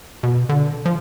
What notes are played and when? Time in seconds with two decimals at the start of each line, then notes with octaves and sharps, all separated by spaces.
0.23 B2
0.49 D3
0.85 F3